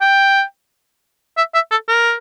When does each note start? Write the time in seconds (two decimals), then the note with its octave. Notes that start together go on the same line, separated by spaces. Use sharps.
0.01 G5
1.37 E5
1.54 E5
1.71 A4
1.88 A#4